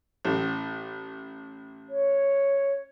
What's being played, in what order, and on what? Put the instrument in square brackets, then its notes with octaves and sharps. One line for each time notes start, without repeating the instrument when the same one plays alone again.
[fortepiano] A1
[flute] C#5